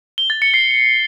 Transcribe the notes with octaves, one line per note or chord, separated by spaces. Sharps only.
G7
A6
C#7
C7